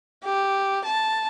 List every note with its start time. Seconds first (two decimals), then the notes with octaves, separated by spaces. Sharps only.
0.24 G4
0.85 A5